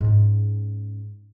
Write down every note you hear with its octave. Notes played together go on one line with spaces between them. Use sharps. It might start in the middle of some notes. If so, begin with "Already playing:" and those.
G#2 C#4